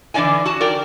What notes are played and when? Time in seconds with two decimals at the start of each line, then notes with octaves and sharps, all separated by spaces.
0.14 D3 E3 D4 D5 D#5 G#5
0.46 F#4 A5
0.61 A#4 D5 G5